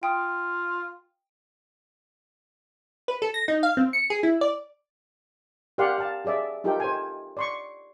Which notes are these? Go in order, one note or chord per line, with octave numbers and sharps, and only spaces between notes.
F4 G5 D#6
B4
A4
A#6
D#4
F5
C4
C#7
G#4
E4
D5
G4 A#4 D5 F5 F#5 C6
F5 A5
F#4 G#4 D5 E5
D#4 F4 G4 A4 A#4 G5
C5 G#5
D5 C6 C#6